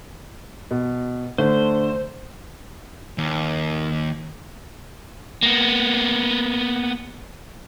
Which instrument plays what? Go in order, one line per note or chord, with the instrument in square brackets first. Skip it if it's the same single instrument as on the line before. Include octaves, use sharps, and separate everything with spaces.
[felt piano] B2
[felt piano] D3 A3 [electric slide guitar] C5
[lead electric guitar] D#2
[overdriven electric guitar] A#3 B3